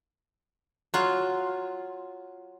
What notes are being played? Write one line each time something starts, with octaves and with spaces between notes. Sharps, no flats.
F#3 F4